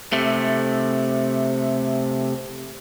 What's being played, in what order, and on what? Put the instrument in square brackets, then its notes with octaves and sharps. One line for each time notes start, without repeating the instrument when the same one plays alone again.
[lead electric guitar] C3 A3